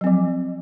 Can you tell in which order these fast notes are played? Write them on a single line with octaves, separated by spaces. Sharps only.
F#3 C4 F3